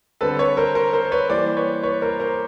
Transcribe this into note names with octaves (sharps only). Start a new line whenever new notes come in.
D3 G3 C4 A4 B4
B4 C#5
A#4 C5
A#4 C5
A#4 C5
B4 C#5
E3 G3 A#3 C5 D5
B4 C#5
B4 C#5
A#4 C5
A#4 C5